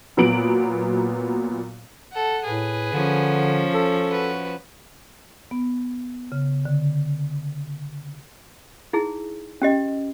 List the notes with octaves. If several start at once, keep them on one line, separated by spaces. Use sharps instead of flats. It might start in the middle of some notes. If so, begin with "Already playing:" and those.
A#2 F#3 B3 D7 F#7
A4 F#5
A2 G#4 B4
D3 F3 C#4
A4
F#4 B4
B3
C#3
D3
D#4 E4 G#4
C#4 G4 D#5